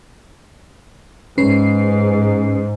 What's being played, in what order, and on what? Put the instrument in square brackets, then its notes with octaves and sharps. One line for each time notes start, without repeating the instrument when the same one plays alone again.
[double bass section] G#2 [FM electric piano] C#4 B4 C7